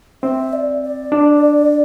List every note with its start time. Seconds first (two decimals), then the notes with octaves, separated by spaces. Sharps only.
0.23 C4 E5
0.53 D5
0.83 D5
1.12 D4